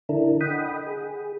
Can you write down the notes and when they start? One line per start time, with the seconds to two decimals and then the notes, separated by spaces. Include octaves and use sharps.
0.09 D3 D4 E4 A4 A#4
0.41 D#5 F#5 G5 B5 D#6
0.87 G#4